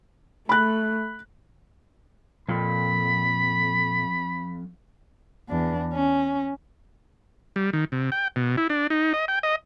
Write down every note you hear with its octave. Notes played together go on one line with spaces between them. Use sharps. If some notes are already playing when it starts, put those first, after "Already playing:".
A3 B5 F#6
F2 A#2 B5
E2 D4
C#4
G3
D#3
C3
G5
B2
E4
D4
D#4
D#5
G5
D#5